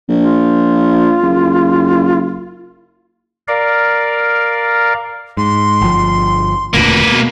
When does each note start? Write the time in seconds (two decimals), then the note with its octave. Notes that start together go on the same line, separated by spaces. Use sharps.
0.09 A#1
0.24 F4
1.22 F#1
3.48 A#4 D5 F5
5.37 G#2 C6
5.81 G1 F3
6.74 E1 D2 A#2 A#3 B4
7.12 B2